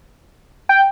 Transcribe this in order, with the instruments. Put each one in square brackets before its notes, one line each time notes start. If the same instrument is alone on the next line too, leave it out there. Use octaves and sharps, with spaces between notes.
[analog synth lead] G5